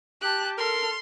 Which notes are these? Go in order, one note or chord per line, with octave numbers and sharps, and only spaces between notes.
G4 A5 F#6
A4 A#4 C6 F6